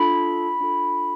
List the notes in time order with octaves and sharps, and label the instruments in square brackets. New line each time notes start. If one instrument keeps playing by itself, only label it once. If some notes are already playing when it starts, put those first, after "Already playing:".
Already playing: [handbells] D4 F4 A4 B5
D4 F4 A4